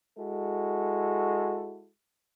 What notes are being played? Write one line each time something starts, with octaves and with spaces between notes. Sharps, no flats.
G#3 E4 F#4 A4